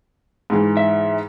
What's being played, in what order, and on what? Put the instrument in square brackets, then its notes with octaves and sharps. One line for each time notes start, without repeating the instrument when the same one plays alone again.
[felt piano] G#2 E3
[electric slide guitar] E5